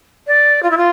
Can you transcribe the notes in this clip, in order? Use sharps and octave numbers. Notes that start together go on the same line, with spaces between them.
D5
F4
E4
F4